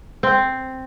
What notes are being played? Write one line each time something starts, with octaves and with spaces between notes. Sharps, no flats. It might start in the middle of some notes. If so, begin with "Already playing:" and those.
C4